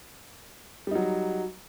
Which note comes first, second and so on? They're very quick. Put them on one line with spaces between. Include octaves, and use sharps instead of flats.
G3 D#4 F#3